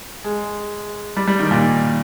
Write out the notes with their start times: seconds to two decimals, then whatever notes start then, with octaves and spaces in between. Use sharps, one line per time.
0.24 G#3
1.17 G3
1.27 G3
1.39 D#3
1.51 A#2